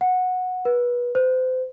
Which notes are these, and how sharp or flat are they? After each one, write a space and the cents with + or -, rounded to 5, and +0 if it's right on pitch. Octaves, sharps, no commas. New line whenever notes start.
F#5 -10
B4 -25
C5 -35